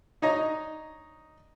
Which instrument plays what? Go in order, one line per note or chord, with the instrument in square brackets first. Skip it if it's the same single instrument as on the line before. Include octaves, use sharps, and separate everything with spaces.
[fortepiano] D4 D#4 C#5 D#5 A#5